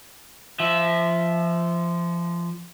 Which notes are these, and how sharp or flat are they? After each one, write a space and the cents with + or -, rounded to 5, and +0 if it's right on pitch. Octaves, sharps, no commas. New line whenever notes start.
F3 -20 E5 +0